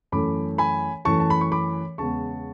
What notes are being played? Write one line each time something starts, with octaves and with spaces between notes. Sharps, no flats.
F#2 E3 A3 B5 D6
G#5 B5
F#2 E3 A3 A5 C#6
A5
B5
C#6
B5 D6
E2 C#3 G#3 B3 A5 C#6